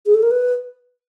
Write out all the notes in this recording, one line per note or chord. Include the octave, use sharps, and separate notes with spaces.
G#4
A4
A#4
B4